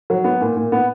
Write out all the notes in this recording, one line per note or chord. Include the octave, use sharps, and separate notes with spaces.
F#3
B3
A#2
A#2
B3